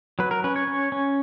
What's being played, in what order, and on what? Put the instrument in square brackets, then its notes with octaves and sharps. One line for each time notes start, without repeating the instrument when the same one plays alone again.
[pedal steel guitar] F#3 B4
A#4
C#4 B4
C#5
C#4
C#4